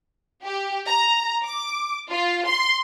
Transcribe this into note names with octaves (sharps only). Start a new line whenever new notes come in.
G4
A#5
D6
F4
C6